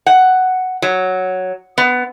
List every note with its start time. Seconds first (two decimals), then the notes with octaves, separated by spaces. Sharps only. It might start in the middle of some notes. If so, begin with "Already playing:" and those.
0.06 F#5
0.82 F#3
1.78 B3